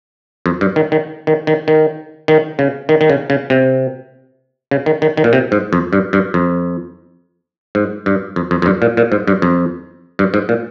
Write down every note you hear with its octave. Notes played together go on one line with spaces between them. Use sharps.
F2
G2
D#3
D#3
D#3
D#3
D#3
D#3
C#3
D#3
D#3
C#3
C#3
C3
C#3
D#3
D#3
D#3
A#2
C3
G#2
F2
G2
G2
F2
G#2
G2
F2
F2
F2
G2
A#2
A#2
G#2
G2
F2
G2
G#2
A#2